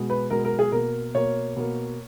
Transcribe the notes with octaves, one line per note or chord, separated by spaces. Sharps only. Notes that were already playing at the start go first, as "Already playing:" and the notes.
Already playing: B2 G#3
B4
B2 G#3 A#4
A#4
G#4
B2 A#3 A#4
B2 A#3 C#5
B2 A#3